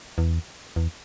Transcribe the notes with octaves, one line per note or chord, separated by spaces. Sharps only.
E2
E2